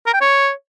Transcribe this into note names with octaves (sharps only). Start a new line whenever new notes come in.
A#4
G5
C#5